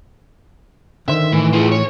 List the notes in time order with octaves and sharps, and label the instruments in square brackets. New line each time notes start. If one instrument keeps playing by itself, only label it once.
[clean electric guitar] D3 C5 [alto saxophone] D#3 [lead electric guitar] E5
[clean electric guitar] A2 [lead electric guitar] E3
[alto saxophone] E3 [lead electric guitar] F4 G#4
[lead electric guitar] C#5